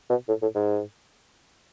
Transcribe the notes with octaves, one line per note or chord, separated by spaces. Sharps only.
B2
A2
A2
G#2